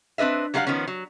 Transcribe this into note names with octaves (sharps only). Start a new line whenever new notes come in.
C4 D4 B4 D#5 E5
F#3 G3 F4 A4 F5 F#5
D#3 F3 B3 C#4
F#3